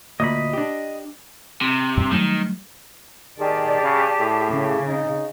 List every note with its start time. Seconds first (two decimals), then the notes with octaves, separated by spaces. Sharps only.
0.20 D2 A#2 D#5 B5
0.53 D4 G4
1.61 C3
1.97 G2
2.12 D#3 F#3 G3 A3
3.39 D#3 G4 G#4 D5 A5
3.83 C#3
4.19 A2
4.51 C#3
4.87 D#4